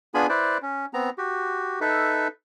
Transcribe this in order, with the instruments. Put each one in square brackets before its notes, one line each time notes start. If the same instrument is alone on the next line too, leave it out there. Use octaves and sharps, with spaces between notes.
[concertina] B3 D4 F4 G#4 G#5 B5
E4 B4 C5 D5
C#4
B3 C4 A#5
F#4 G4
D#4 A4 B4 E5